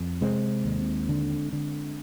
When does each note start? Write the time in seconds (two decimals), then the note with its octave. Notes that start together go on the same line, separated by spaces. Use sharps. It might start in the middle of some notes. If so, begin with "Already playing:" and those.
Already playing: F2
0.21 C3 G#3 C4
0.65 D#2
1.09 D3
1.53 D3